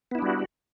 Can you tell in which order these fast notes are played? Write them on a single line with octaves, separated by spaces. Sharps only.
B3 E4 D4 G3 F#4